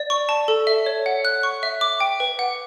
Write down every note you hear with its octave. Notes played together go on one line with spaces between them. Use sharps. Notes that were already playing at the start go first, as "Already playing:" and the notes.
Already playing: D5
C#6
A5
A4
E5
C#5
F#5
F#6
C#6
E5
D6
G5
B4
F#5